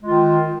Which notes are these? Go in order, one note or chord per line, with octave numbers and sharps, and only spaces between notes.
D#3 G#3 F4